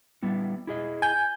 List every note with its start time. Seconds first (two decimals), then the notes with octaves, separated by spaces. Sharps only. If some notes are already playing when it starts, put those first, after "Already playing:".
0.23 G3 B3 E4
0.67 E4 G#4 D#5
1.02 G#5 G6